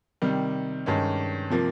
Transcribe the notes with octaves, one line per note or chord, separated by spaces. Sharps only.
C3 D#3 G3
G2 D#3 G#3 C#4
C3 F3 A#3